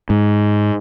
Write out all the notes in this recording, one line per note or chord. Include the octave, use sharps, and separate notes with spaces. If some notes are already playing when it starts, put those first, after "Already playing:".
G#2